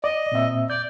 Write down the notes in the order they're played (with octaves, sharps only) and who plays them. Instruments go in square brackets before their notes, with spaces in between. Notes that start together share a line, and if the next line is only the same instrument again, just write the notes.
[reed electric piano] D5 [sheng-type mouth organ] D#5
[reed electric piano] A#2 C4 E5
[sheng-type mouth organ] D5 [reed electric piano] G6